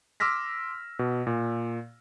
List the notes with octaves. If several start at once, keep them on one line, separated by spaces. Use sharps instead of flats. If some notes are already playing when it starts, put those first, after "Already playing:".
C6 D6 E6 F6 A#6 B6
B2
A#2